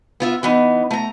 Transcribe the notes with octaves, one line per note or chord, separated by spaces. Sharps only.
B3 F4 E5
E3 B3 D#4
A3 A#5